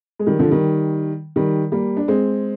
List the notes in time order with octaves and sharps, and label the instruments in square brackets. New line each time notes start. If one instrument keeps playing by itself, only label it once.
[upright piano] G#3
D#3 G3
D3 F3
D#3 G3
D#3 G3
G3 A#3
D4
G#3 C4